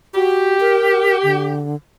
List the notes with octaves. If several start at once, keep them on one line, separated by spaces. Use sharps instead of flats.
F#4 G4
A#4
D3